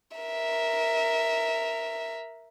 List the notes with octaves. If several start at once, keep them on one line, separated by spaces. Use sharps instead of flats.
A#4 E5